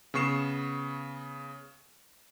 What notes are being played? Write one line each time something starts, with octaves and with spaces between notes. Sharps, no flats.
C#3 B3 C#6 C7 E7